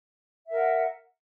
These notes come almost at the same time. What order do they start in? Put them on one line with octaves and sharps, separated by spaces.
E5 A#4 F#5